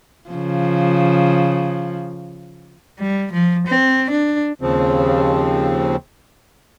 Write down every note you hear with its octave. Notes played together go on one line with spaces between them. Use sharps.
C#3 F3
G3
F3
C4
D4
D#2 C#3 F3 C4